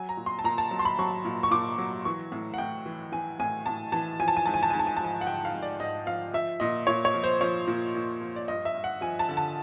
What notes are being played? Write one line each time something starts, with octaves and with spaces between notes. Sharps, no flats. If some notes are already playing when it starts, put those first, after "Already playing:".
Already playing: F#3 G#5
A#5
A#2
C6
A5
A#2 A#5
A5
F#3
C6
B5
F#3 C#6
A#2
C#6
A#2 D6
F#3
E3 C#6
A2
F#5
A2 G5
E3
E3 G#5
A2 G#5
A2 A5
E3 A5
F3 G#5
A5
G#5
G#2 A5
G#5
A5
G#2 G#5
A5
G#5
A5
F3 G#5
F#5
F3 G5
F5
G#2
D5
G#2 D#5
F3 F5
F3 E5
A#2 D#5
A#2 C#5
C#5
F3
C5
F3 C#5
A#2
A#2
F3
D5
G2 D#5
E5
G2
F#5
F3 G#5
A5
D3
A5